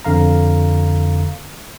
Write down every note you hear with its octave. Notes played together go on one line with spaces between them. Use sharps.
F2 D3 F5 A#5